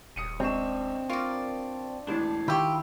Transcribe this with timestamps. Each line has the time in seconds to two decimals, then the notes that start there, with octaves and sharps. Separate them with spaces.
0.16 D#1 D#6 C#7 D#7
0.40 C#2 C4 D4 C#6 E7
1.10 F4 A#4 D5 C#6
2.07 E1 A1 E3 D4
2.48 D#3 E4 F4 G4 B5 C#6 G6